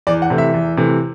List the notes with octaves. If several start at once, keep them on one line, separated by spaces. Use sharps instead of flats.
E2 D5
F#5
C3 E3 A3
E5
E2
C3 E3 A3